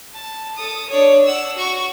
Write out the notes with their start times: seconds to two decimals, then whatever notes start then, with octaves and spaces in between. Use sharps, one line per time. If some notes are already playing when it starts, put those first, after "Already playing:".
0.14 A5
0.56 A4 D#6
0.89 D4 C#5
1.26 F#5 E6
1.56 F#4 C#6